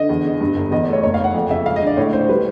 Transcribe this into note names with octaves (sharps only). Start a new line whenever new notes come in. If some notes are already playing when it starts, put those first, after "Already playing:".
Already playing: D3 D#5
E2
C#3
G2
G1
E2 D#5
D5
A3
C#5
F#1 C#5
F5
F#1 F#5
F2
C#3 E5
G#3 F5
D#5
D3 D5
A2 C#5
C#4 C5
G3 B4